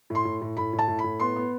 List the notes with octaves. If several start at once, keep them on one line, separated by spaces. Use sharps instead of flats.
A2 C6
A2
A2
A2 B5
A2
A5
A2
B5
A2
B3 C6
B3